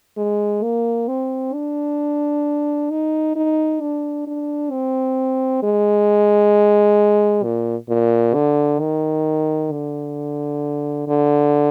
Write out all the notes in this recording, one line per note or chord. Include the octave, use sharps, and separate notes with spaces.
G#3
A#3
C4
D4
D#4
D#4
D4
D4
C4
G#3
A#2
A#2
D3
D#3
D3
D3